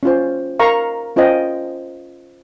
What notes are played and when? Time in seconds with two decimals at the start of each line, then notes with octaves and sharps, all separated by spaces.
0.03 C#4 F4 C5
0.59 A#4 F5 A#5 C#6
1.16 C#4 F4 C5 D#5 G5